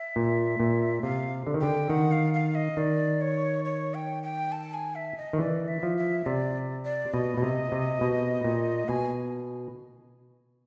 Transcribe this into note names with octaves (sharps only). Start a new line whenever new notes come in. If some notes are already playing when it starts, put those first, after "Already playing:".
Already playing: E5
A#2
A#2
C3 F5
D3
D#3
D3 G5
D#3 F#5
F5
F5
D#5
D#3 D5
C#5
C#5
G5
G5
A5
G#5
E5
D#5
D#3
E3 D5
E5
F3
E5
C3 D5
D5
B2 D#5
B2
C3
C3
B2
A#2
B2 G#5